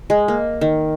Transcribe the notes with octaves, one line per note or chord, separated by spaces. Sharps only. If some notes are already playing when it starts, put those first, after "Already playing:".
G#3
A#3
D#3